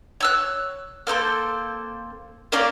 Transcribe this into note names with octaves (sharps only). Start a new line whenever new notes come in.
C#5 E6 F#6
A#3 C4 A4 C5
A#3 C#4 D5 F5